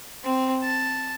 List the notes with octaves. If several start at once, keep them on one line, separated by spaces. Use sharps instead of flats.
C4
A5